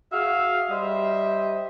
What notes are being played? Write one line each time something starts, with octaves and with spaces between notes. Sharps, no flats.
F#4 G#4 E5 F5
G3 C5 D#5 E5